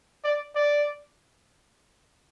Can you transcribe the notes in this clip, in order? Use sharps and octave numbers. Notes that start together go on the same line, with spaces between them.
D5
D5